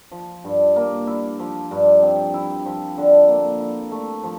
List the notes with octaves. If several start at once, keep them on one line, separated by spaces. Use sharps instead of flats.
F3
G2
A#3
E4
F3
G2
C4
E4
F3
D3
A#3
E4
A3
F3